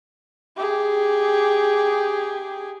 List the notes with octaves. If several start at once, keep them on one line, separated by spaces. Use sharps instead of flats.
G4 G#4